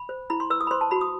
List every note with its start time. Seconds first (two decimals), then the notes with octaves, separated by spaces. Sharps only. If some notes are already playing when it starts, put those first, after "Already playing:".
Already playing: B5
0.09 C5
0.30 E4 B5
0.40 C6
0.50 B4 E6
0.61 D#6
0.67 B5
0.71 C5 C6
0.81 A5
0.91 F#4 B5
1.01 D#6